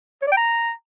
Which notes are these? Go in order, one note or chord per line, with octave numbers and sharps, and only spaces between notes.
C#5
D5
G5
A#5